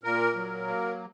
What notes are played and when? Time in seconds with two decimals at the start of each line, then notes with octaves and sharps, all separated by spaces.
0.03 A#2 A#4
0.35 F#3
0.67 A#3